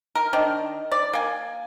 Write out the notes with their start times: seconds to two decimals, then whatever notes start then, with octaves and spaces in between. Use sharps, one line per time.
0.15 A#4
0.33 D#3 D4
0.92 D5
1.13 A#3 G#5